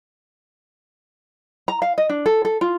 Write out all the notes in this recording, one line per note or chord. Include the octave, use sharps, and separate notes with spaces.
A#5
F5
D#5
D4
A4
A4
F4